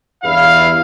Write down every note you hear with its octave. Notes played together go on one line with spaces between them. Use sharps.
E2 G2 E4 F5